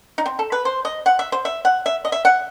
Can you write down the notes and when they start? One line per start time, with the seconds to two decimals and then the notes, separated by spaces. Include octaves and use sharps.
0.18 D#4
0.26 C4
0.39 A4
0.52 B4
0.65 C5
0.85 D#5
1.06 F#5
1.19 E5
1.32 C5
1.45 E5
1.65 F#5
1.86 E5
2.05 D#5
2.12 E5
2.25 F#5